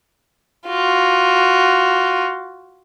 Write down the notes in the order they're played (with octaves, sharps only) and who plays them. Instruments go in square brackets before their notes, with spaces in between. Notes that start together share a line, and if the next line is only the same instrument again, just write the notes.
[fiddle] F4 F#4